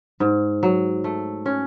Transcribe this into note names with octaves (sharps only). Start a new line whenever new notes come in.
G#2
F#3
A3
C#4